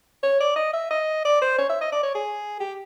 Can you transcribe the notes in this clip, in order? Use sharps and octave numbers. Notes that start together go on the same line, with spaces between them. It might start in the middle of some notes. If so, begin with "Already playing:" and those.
C#5
D5
D#5
E5
D#5
D5
C5
C#5
E5
D#5
D5
C#5
G#4
G4